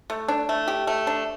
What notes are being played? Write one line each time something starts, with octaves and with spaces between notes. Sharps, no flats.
A3
D4
A3
G4
A3
D4